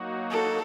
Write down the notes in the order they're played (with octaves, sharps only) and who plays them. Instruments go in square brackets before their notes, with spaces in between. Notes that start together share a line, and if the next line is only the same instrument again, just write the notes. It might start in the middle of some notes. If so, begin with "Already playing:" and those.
Already playing: [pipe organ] F#3 A#3 D#4 F#4
[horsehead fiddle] A4